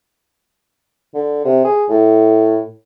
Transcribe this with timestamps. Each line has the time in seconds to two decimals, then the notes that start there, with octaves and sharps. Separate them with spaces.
1.15 D3
1.45 C3
1.65 G#4
1.89 A2